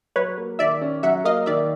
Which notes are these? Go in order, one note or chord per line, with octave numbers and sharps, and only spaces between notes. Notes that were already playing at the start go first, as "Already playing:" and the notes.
F#3 B4 C#5
A#3
D#3 D5 E5
C#4
F#3 E5 F#5
A#3 D#5 F5
D#3 D5 E5